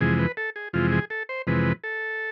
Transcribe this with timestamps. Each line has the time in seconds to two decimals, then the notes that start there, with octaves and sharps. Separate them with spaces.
0.01 F2 C3 E3 G#3 G#4
0.19 B4
0.37 A4
0.56 G#4
0.73 F2 C3 E3 G#3 F4
0.92 G#4
1.10 A4
1.29 C5
1.47 F2 C3 E3 G#3 B4
1.84 A4